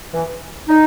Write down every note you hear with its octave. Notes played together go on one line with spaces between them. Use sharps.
E3
D#4